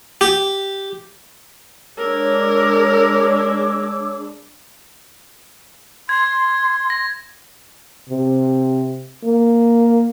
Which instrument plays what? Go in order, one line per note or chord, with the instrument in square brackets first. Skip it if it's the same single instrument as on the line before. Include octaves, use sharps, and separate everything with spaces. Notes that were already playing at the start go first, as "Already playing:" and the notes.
[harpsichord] G4
[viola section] G#3 D4 [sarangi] A#4 [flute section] C#5 D6 E6
[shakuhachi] C6 [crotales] G#6
[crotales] A#6
[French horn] C3
A#3